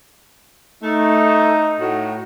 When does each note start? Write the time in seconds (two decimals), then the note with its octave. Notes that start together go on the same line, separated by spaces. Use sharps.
0.83 A3 D#4
1.80 A2 F#4